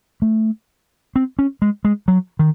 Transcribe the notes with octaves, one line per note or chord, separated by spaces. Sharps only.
A3
C4
C#4
G#3
G#3
F#3
D#3